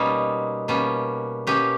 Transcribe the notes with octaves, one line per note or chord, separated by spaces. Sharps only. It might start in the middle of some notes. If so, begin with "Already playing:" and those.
Already playing: B2 G3 A#3 C#4 D#4
B2 G3 A#3 C#4
B2 A#3 C#4 G4